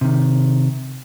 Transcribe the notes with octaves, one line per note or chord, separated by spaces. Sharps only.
C3 D#3